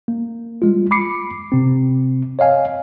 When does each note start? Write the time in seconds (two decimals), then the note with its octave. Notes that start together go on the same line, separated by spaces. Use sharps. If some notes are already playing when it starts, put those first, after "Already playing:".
0.08 A#3
0.62 G3 G#3 F4
0.91 B5 D6 C7 C#7
1.52 C3 C4
2.39 C#5 D#5 F5 G#5